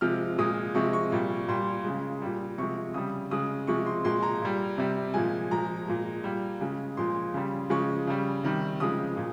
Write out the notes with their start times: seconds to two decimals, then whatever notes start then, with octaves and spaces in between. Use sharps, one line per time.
0.01 C3 F3 G#3 F6
0.38 A#2 G#3 D#6
0.75 C3 F3 G#3 C#6
0.93 C#6
1.12 A#2 G3
1.48 A#2 G3 C6
1.85 C#3 G#3
2.22 A#2 G3
2.58 C3 F3 G#3 C#6
2.94 C#3 G3 D#6
3.31 C#3 G#3 D#6
3.67 C3 F3 G#3 C#6
3.86 C6
4.04 A#2 G#3 C6
4.23 A#5
4.42 A#2 G3
4.78 C3 G3
5.14 A#2 F3 G#3 G#5
5.51 A#2 F3 G#3 A#5
5.88 A#2 G#3
6.24 A#2 G3
6.61 C#3 G#3
6.97 A#2 F3 G#3 C6
7.34 C#3 G3
7.70 C#3 F3 G#3 C#6
8.07 C#3 G3
8.43 C3 D#3 G3
8.80 C#3 F3 G#3 D#6
9.17 A#2